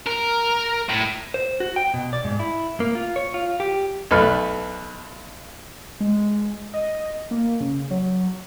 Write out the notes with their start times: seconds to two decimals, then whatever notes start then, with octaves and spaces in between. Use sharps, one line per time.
0.06 A#4
0.89 A2
1.34 C5
1.60 F#4
1.76 G5
1.94 B2
2.13 D5
2.24 G#2
2.39 E4
2.80 A#3
2.95 F4
3.16 C#5
3.34 F4
3.60 G4
4.11 B1 A3 B4 F6
6.00 G#3
6.74 D#5
7.31 A#3
7.60 C#3
7.91 F#3